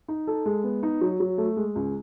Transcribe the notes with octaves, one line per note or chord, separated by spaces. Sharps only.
D#4
A4
G#3
B3
D#4
F#3
F#3
A3
G#3
C#2